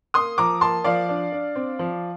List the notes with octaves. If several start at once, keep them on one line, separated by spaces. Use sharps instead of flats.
A#3 C6 D#6
F3 A#5 D6
A#3 A5 C6
F3 D5 F5
D4
D4
C4
F3